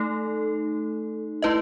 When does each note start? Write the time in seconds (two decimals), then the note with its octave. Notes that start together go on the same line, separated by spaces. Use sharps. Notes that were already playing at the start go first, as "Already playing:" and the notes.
Already playing: A3 D#4 A4
1.42 A3 E4 B4 D#5